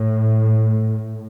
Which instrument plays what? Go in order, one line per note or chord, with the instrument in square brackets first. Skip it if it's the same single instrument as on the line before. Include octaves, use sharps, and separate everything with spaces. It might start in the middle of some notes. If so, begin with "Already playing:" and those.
Already playing: [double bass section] A2